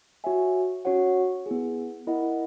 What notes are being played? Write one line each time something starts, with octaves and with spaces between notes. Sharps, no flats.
F#4 C#5 E5 G#5
C#4 F#4 C#5 F#5
B3 E4 G#4
E4 A#4 D#5 F#5